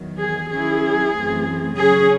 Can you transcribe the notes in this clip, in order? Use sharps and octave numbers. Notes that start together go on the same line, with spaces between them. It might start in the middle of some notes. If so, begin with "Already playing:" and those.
Already playing: E2 D#3 F#3
G#4
D#3 F#3 C#4 E4 G#4
F#2 E3 A3 C4
C#3 F#3 C#4 G#4